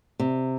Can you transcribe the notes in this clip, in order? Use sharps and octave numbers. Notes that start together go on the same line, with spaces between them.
C3